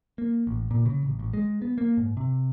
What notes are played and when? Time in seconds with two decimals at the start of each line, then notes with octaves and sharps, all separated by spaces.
0.18 A#3
0.47 A1
0.71 A#2
0.86 C#3
1.05 A1
1.19 A1
1.33 G#3
1.62 B3
1.78 A#3
1.97 G#2
2.17 C3